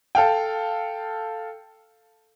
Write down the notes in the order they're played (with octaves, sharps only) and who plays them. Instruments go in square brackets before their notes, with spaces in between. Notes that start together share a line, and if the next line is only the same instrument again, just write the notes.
[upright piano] A4 F5 G5